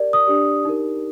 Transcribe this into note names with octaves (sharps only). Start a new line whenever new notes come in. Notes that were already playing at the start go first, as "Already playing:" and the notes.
Already playing: G4 A#4 D5
D#6
D4 G4 D5
D#4 G4 A#4